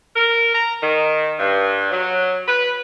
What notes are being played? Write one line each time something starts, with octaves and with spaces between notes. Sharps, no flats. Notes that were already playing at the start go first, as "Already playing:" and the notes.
A#4
A#5
D#3
G2
F#3
B4